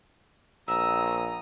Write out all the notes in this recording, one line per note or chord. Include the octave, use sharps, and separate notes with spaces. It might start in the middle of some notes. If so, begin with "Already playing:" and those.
A#1 A#5 D#6 E6